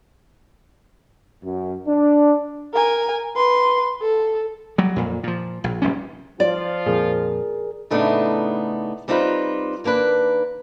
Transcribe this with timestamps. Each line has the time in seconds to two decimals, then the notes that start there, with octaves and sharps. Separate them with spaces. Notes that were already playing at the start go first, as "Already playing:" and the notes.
1.43 F#2
1.87 D4
2.73 A#4 G#5
3.36 B4 C6
4.02 A4
4.78 F#3 G3
4.96 F2 A#2
5.23 A#2 F3
5.64 A#1
5.82 F1 A#1 G3 C#4
6.40 F3 F4 D5
6.87 F2 A#2 G#4 A#4
7.90 A2 C#3 A3 B3 D4 D#4
9.08 G3 C4 D#4 F4 A#4 B4
9.84 D#3 A#3 D4 B4